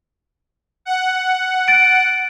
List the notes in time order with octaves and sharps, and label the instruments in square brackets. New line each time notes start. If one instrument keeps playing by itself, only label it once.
[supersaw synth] F#5
[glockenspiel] A6 D7